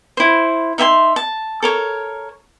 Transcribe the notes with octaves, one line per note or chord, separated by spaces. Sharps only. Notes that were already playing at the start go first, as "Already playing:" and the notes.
E4 C5
D#4 E5 G#5 C6
A5
A4 A#4 C#5